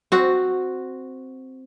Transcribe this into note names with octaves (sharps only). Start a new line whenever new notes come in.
C4 F#4